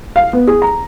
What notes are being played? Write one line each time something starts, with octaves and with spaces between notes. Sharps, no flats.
F5
B3
G#4
A#5